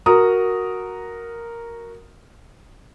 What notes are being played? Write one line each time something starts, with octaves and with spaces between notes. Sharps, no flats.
F#4 A#4 A#5 D#6